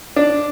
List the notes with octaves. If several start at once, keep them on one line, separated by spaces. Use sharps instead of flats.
D4